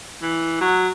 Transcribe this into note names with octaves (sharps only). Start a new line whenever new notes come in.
E3
F#3